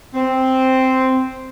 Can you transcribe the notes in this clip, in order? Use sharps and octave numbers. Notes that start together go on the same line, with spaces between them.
C4